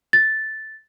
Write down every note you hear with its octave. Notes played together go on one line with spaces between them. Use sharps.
A6